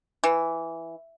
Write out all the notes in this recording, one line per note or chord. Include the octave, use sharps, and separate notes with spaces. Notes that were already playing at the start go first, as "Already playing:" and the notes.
E3